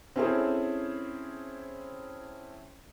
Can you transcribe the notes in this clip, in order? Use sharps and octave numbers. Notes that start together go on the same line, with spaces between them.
C4 C#4 E4 G#4 A4 C5